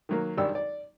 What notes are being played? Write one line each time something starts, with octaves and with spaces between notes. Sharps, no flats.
D#3 F#3 A#3
G#1 D#3 G3 D4 G4 E6
D5